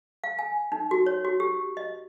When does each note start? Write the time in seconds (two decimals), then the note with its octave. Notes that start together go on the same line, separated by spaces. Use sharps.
0.24 F5
0.39 G#5
0.72 D#4
0.91 F#4
1.06 C#5
1.25 F#4
1.40 G4
1.77 D#5